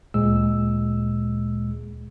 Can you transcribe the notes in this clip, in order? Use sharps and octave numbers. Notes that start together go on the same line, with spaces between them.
D2 A#2 G#3 E6